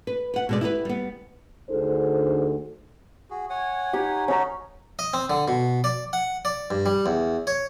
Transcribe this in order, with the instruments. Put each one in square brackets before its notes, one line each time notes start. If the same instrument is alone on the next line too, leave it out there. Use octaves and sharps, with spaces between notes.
[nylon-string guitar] B4
B4 F#5
B2 G#3 D5
E4 G4 A#4 B4
G3 B3
[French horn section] D2 D3 D#4 G#4 A4 C5
[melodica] F#4 G#4
C#5 F#5 G#5
[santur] D#4 G4
[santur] C#4 A#5 [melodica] D#4 F#4
[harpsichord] D#5
C4
D3
B2
D5
F#5
D5
G2
G3
E2
C#5